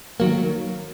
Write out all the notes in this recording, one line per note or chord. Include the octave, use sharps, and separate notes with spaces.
D#3 F#3 A#3